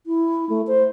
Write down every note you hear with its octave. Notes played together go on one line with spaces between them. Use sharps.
E4
A3
C5